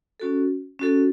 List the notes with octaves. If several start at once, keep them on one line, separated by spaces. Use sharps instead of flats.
C#4 F#4 A4
C#4 F#4 A4